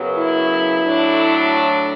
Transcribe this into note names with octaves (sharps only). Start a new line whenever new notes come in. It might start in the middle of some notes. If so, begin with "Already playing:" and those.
Already playing: F#2 C#3 F#3 B3
E4
A2 F#3 A3 D4